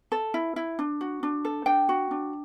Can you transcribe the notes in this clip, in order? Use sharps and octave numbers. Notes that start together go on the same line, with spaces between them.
A4
E4
E4
D4
F#4
D4
A4
D4 G5
F#4
D4